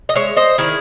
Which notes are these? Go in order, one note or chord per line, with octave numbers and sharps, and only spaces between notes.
D#5
G#3 C#5 E5
C5 D#5
D#3 E4 G#4